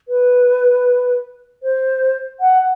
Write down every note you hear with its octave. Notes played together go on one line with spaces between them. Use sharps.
B4
C5
F#5